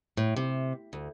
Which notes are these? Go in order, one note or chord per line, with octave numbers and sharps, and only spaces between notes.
A2
C3
D2